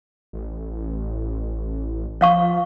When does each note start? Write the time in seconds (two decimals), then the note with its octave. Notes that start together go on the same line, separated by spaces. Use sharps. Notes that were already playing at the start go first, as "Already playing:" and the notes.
0.33 A1
2.21 F3 C#5 F5 C#6